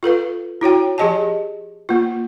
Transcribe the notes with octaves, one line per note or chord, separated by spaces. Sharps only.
F4 A4 B4 F5
E4 F#4 C#5 G5
F3 G4 G#4 D#5 G#5 A5
A#3 F4